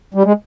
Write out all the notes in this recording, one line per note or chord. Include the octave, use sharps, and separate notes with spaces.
G3
G#3